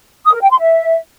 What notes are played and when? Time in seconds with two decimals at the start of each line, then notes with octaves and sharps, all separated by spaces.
0.24 D#6
0.33 A#4
0.41 G5
0.50 C6
0.59 E5